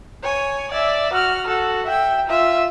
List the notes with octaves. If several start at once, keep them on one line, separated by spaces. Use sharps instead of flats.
C#5 G#5
D5 E5
F#4 F6
F#4 A4
E5 G5
F4 E5